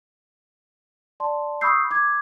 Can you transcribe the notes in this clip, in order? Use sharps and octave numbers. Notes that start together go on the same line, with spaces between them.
D5 A5 C6
B5 C#6 D#6 E6 G6 C7
D6 G#6